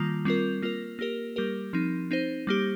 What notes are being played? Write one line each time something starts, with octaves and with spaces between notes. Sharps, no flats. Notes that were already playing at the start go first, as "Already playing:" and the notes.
Already playing: D#3 G3 A#3 F4
G3 C4 F4 A#4
A#3 F4 A#4
A#3 G4 A#4
G3 A#3 G4 A#4
F3 C4 D#4
C4 D#4 C5
G3 A#3 G4